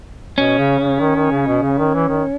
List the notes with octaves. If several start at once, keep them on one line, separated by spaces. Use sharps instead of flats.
B2 C#4
C#3
C#3
D#3
D#3
C#3
B2
C#3
D#3
E3
D#3